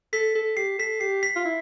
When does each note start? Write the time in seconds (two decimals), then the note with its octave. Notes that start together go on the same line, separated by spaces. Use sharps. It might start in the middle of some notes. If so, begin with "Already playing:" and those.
0.13 A4 B6
0.35 A4
0.57 G4 C7
0.79 A4 B6
1.00 G4 C7
1.23 B6
1.36 F4
1.45 E4